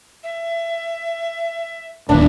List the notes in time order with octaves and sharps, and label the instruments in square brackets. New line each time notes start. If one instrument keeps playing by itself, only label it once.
[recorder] E5
[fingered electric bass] D1 D#2 [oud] B3 D4 [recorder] E5